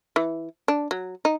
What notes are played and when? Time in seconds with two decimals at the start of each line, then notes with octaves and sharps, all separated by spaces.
0.16 E3
0.68 D4
0.91 F#3
1.25 D#4